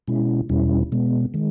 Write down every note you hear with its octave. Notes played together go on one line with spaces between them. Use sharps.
B2 G#3 C#4 E4
E2 B2 G3 C#4 E4
B2 G#3 B3
D#3 G#3